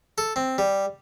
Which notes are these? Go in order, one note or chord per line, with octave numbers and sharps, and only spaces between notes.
A4
C4
G3